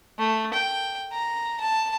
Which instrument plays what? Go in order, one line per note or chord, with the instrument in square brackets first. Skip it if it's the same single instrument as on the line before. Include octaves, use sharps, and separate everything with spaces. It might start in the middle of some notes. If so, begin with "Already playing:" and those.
[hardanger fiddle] A3
G5
A#5
A5